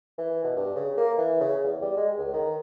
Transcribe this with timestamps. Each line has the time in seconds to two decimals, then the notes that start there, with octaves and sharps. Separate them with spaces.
0.18 E3
0.44 B2
0.57 G2
0.75 C#3
0.97 A#3
1.18 E3
1.41 C#3
1.64 E2
1.82 G3
1.97 G#3
2.18 C#2
2.33 D#3